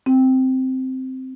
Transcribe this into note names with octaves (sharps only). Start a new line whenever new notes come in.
C4